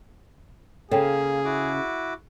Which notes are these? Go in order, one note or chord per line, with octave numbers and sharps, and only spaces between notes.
C#3 A#3 G#4 A4 C#5 G5
E4 F#4 D6